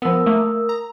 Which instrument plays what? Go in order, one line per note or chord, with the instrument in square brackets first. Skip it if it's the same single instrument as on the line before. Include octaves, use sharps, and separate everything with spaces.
[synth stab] F3 B3 [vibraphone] A#4 D#6 E6
[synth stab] A3 A#3
A#5